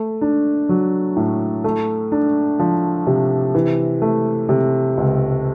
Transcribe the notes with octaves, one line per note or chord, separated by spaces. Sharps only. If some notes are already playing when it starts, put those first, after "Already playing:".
Already playing: A3
D4
F#3
A2
A3
D4
F3
C3
E3
A3
C3
C#2